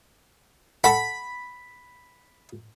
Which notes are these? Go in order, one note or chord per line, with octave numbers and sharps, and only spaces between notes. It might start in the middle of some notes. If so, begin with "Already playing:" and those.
A4 F#5 B5